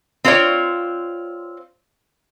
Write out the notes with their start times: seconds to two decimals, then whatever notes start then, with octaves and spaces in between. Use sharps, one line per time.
0.24 C4 F4 G#4 A#4 C#5 D5